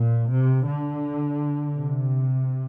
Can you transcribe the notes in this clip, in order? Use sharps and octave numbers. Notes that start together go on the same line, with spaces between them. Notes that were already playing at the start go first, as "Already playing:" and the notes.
Already playing: A#2
C3
D3
C3